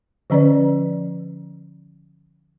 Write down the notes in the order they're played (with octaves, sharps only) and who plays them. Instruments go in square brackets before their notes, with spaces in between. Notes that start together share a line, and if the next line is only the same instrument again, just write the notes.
[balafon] D3 F3 C#4 B4 D5